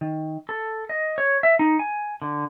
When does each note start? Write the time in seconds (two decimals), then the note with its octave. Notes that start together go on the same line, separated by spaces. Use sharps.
0.01 D#3
0.49 A4
0.89 D#5
1.18 C#5
1.43 E5
1.59 D#4
1.79 G#5
2.22 D3